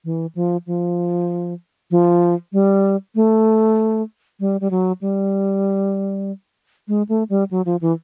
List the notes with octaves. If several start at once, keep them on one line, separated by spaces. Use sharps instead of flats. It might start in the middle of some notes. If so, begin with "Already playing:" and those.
E3
F3
F3
F3
G3
A3
G3
G3
F#3
G3
G#3
A3
G3
F#3
F3
E3